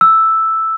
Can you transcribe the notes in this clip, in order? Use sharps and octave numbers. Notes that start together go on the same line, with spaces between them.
E6